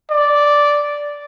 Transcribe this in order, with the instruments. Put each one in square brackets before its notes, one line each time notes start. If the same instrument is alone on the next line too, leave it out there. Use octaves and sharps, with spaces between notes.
[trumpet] D5